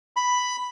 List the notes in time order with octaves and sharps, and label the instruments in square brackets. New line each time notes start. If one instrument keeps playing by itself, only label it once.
[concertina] B5